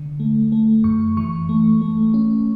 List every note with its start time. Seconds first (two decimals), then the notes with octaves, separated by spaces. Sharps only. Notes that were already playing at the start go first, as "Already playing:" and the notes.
Already playing: D3
0.20 A3
0.52 A3
0.84 F#2 C#6
1.17 E3 C#6
1.49 A3
1.82 A3
2.14 C#4